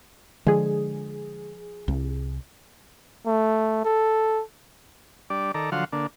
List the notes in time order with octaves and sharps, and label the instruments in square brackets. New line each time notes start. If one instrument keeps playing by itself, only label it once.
[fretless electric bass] D3 G#3 [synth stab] F3 G#4
[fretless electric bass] C2
[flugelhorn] A3
A4
[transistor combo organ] G3 D4 D5
D#3 A4 D5 A#5
D3 F3 F#3 F5 F#5 C6
D3 A#3 D4